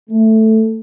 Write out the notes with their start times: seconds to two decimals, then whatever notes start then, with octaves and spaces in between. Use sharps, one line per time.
0.10 A3